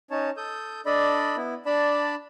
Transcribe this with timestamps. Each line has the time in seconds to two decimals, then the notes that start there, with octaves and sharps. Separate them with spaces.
0.11 C#4 D#4 C#5 A5
0.37 A4 D#6 G6
0.86 D4 A4 D5 D#5 B5
1.37 B3 E4
1.66 D4 D5 A5 B5